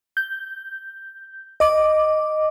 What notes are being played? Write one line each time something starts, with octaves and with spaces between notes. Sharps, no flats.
G6
D#5 D6